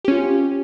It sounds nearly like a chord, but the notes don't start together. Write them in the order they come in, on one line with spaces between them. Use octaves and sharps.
G4 C#4 F4